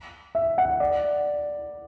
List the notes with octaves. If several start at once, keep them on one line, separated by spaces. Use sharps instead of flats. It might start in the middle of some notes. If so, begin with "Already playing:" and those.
E5
F#5
D5